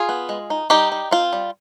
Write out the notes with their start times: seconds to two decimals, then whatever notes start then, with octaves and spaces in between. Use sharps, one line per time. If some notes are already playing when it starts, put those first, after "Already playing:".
Already playing: F4 G#4
0.09 B3
0.29 G#3
0.50 D#4
0.70 G3 D#4 G4
0.92 D#4
1.11 C4 F4
1.33 G3